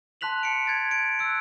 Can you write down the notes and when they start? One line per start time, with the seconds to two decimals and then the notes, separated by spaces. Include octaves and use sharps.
0.21 A5 C6 F#6 B6 F7 F#7
0.43 A5 C#7 D7
0.66 G#6 A6 D7
0.91 D7
1.19 E6 F#6 D7